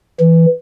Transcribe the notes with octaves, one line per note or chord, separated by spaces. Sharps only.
E3